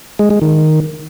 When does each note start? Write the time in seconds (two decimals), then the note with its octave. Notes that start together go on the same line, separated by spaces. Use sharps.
0.19 G#3
0.30 G#3
0.42 D#3